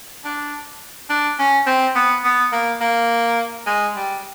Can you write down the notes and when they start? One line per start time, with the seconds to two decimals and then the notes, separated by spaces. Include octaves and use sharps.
0.24 D4
1.09 D4
1.39 C#4
1.66 C4
1.95 B3
2.24 B3
2.52 A#3
2.81 A#3
3.67 G#3
3.96 G3